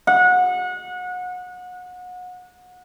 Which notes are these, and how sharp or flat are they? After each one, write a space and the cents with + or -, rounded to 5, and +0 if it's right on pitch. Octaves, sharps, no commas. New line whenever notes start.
F#5 -30